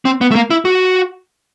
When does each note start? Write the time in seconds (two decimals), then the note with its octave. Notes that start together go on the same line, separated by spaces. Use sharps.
0.05 C4
0.21 B3
0.31 A3
0.35 A#3
0.51 E4
0.65 F#4